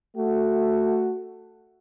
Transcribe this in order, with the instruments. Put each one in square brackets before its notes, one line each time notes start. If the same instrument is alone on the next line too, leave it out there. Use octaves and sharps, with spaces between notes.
[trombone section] A3 F#4